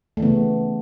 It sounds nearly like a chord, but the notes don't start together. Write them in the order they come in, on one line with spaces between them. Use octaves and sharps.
A3 E3 B3 C#3